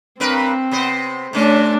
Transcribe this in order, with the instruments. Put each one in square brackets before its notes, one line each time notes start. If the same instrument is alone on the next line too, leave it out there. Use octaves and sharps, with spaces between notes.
[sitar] G2 A#4 B4 [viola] C4
[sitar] C3 B3 C5
[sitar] C3 C#4 [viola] A3 D4